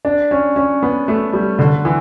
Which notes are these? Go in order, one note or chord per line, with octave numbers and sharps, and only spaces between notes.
D4
C#4
C#4
B3
A3
G3
D3
E3